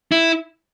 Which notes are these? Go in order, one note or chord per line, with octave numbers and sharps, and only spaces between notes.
E4